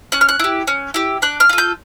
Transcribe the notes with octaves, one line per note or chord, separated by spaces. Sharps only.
C#4 F#6
F6
F#6
E4 G4
C#4
E4 G4
D4 F#6
F6
F4 A4
G6